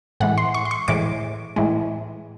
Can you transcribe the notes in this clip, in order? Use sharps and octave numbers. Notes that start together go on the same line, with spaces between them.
A2 E3 G#3 F#5
C6
C#6
C6
C#6
A2 E3 G#3 D6
A2 E3 G#3